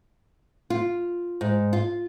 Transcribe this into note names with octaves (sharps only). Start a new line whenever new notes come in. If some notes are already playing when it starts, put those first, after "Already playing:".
F4
G#2
F4